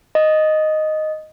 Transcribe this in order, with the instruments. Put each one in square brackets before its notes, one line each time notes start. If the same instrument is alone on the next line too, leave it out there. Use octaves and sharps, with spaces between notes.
[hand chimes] D#5